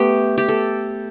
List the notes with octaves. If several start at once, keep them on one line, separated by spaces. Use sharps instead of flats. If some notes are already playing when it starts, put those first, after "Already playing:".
Already playing: A3 B3 G4
G4
A4